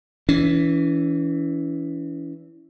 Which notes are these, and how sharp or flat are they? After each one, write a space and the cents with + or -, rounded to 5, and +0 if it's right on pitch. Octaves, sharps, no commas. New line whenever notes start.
E3 +0 C#4 +35